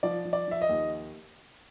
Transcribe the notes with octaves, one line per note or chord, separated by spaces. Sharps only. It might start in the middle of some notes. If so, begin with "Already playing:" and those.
F3 D5
F3
D5
F3 E5
D#5
D#2